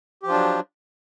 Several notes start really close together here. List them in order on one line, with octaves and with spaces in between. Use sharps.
G4 F3 F4 D4 F#3